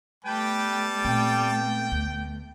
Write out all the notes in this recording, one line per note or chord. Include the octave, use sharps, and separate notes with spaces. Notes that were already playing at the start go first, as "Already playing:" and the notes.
G3 A3 B3 B4 G5 A5
A#2 C4 G5
D2